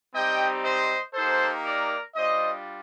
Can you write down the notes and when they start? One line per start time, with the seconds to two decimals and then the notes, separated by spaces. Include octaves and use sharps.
0.13 G3 C4 D#4 G4 D#5 G5
0.64 C5 D#5
1.14 A#3 D#4 G4 A4 C5
1.64 A#4 D5
2.15 G3 D4 F4 C5 D#5